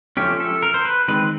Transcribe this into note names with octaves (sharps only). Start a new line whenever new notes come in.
F3 A3 C#4 G4
A4
A#4
C5
B4
D#3 G#3 C4 B4